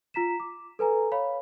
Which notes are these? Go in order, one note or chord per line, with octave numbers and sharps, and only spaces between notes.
F4 A#5 B6 E7
D6
A4 B4 G#5 A#5
C#5 F5 B5